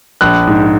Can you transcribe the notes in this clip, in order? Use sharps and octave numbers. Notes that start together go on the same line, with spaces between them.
A#1 F#6
G#2